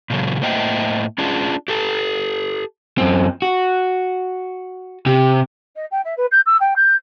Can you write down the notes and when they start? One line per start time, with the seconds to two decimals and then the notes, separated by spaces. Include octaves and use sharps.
0.10 A#2 C#3 F#3
0.42 A2 A#3 C5 D#5 E5 G5
1.18 C#4 D4 F4 G#4
1.68 G4 A4
2.98 F#2 C4
3.42 F#4
5.06 C3 G4
5.76 D#5
5.91 G5
6.04 E5
6.17 B4
6.31 G6
6.46 E6
6.60 G5
6.76 G6